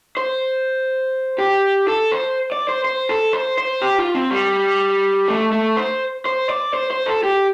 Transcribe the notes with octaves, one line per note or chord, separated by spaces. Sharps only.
C5
G4
A4
C5
D5
C5
C5
A4
C5
C5
G4
F4
C4
G3
A3
A3
C5
C5
D5
C5
C5
A4
G4